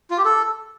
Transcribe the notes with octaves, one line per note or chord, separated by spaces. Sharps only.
F4
G4
A4